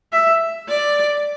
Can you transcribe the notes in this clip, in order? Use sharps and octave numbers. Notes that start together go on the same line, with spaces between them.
E5
D5